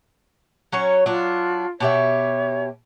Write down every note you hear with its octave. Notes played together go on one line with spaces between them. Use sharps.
F#3 C#4 C#5
F#3 D4 F4
B2 G4 C#5 E5